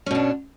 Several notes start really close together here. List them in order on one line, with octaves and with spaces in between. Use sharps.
C#4 B2 D4